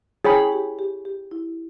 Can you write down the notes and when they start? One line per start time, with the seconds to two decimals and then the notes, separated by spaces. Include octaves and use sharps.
0.25 E4 G#4 C#5 G5 B5
0.52 G4
0.79 G4
1.05 G4
1.31 E4